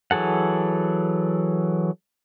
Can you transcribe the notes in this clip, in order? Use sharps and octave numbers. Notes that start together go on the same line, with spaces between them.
E3 F#3 G#4 A4 F#5